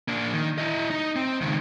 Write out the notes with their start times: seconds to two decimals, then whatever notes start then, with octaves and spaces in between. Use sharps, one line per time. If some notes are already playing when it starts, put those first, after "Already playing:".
0.08 A#3 D4
0.33 D#3
0.58 E4 D#5
0.90 D#4
1.16 C4
1.41 C#2 D#3